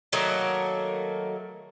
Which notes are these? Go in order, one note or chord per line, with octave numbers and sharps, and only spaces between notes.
D#3 F#3 A3 A#3